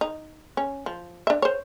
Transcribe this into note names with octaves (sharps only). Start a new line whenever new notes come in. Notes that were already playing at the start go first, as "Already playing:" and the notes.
D#4
C#4
F3
D4 E5
C5 C#5